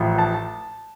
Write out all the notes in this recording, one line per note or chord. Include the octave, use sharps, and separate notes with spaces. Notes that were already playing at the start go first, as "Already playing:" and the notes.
Already playing: A1 A2 F3
A5